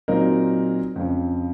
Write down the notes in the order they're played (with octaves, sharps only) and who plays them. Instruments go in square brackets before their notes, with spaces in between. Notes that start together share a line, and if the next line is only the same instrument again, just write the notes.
[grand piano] A#2 F#3 C4 D#4 A#4
F2 C#3 F3